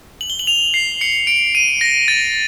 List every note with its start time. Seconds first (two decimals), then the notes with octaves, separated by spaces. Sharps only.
0.21 F#7
0.30 G7
0.39 F#7
0.47 F7
0.74 C7
1.01 C#7
1.27 D7
1.55 D#7
1.81 A#6
2.08 A6